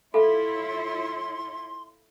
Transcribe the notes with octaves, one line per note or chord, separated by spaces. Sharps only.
E4 F4 A4 C#5 E5 F5 B5 C6